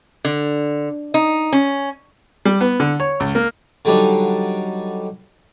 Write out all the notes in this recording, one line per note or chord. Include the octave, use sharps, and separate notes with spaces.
D3
D#4
C#4
G3
B3
D3
C#5
C#2
A#3
D3 F#3 G3 D4 D#4